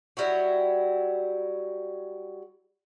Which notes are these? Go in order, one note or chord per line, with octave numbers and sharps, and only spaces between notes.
F#3 G3 E4 F#4